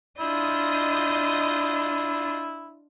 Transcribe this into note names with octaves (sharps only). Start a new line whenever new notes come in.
D4 E4 F4 D#5 D#6 G6